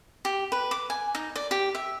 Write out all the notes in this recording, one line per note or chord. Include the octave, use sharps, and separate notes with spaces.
G4
B4
D6
G#5
D#4
D5
G4
E5